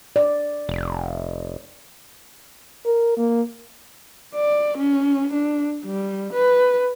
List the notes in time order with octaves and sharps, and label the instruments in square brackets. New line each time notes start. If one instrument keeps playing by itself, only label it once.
[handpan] D5
[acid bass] F1
[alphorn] A#4
A#3
[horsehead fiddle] D5
C#4
D4
G3
B4